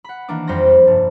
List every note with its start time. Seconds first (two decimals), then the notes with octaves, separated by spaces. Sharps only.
0.04 F#5 B5
0.28 D#3 E3 A#3 D4 D6
0.47 F2 G3 C5 B5 C6 A#6
0.67 G3
0.87 F1 G2 A5